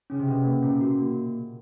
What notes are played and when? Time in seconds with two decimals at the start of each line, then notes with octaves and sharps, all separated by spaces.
0.10 C#3 C#4
0.19 C3
0.27 B2 C#4
0.45 A#3
0.62 A#2 C#4
0.81 F#4
0.99 A#3